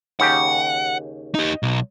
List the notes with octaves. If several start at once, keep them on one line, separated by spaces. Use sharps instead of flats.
D#2 C#3 G4 F#5
D#4 G4 D#5
B1